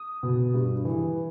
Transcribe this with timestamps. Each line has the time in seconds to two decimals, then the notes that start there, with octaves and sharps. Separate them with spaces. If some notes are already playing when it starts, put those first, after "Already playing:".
Already playing: D#6
0.23 B2
0.54 G2
0.85 E3